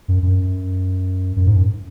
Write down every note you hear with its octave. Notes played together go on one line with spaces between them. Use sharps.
F#2
F#2
F#2
G#2
F#2